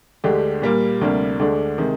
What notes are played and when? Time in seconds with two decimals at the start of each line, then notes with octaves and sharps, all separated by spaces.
0.24 D2 D3 G#3 D4 G4
0.62 A#2 G3 A#3
1.01 D2 C3 G3 A#3 D4
1.39 D2 D3 G#3 D4
1.78 C3 D#3 G#3